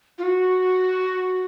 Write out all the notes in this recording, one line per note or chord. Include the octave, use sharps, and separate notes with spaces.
F4
F#4